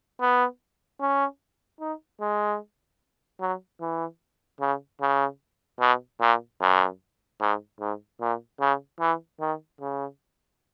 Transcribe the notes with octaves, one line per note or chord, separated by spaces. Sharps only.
B3
C#4
D#4
G#3
F#3
E3
C#3
C#3
B2
A#2
F#2
G#2
G#2
A#2
C#3
E3
D#3
C#3